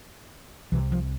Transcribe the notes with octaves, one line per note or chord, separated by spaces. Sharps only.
C2 C3 E3
F3